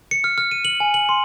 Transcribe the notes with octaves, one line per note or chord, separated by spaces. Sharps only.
C#7
F6
F6
D#7
F#7
G#5
F#7
C6